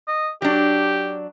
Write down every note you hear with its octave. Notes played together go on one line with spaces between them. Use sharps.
D#5
F#3 D4 G4